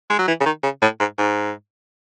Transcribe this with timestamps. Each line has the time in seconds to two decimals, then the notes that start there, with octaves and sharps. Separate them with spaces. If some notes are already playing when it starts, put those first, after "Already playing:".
0.10 G#3
0.19 F#3
0.27 E3
0.40 C#3
0.45 D#3
0.63 C#3
0.82 A2
1.00 G#2
1.18 G#2